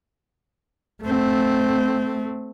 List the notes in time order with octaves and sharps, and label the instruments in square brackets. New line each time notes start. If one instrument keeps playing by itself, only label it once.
[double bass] A3 C4